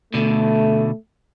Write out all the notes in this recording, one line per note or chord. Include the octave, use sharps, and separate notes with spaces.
B2 D3 A3